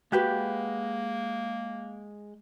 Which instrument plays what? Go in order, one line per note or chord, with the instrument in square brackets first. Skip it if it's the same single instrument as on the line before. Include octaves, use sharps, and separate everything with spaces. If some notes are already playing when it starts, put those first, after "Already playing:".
[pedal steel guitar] G#3 F#6 G6 [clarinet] A#3 [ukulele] F#4 G4 B4